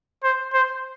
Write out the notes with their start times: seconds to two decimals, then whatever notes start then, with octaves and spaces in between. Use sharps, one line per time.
0.23 C5
0.53 C5